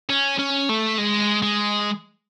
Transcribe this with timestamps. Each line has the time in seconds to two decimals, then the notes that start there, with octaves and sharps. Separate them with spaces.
0.09 C#4
0.39 C#4
0.69 A3
0.98 G#3
1.43 G#3